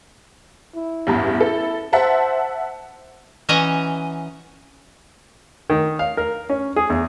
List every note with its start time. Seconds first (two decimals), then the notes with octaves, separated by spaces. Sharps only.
0.76 E4
1.07 A1 E2 G2
1.41 A4
1.93 C5 E5 F#5 A5
3.49 E3 C#4 D#5 F#5 G#5 A#5
5.70 D#3
5.99 F5
6.17 A#4
6.49 C#4
6.76 G#4
6.90 E2